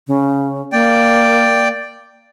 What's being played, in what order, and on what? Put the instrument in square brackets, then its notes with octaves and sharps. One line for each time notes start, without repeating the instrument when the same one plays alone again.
[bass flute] C#3
[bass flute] A#3 [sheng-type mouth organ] D5 G5